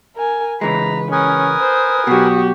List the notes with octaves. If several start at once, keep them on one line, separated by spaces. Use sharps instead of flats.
A#4 G#5
C#3 E3 G#3 B4 A#5
C#4 A#4 B4 G#5 D#6
C5
B2 F#3 F#4 G4